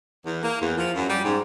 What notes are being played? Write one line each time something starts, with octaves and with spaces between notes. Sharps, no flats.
E2
A#3
E2
F3
F#2
G3
G#2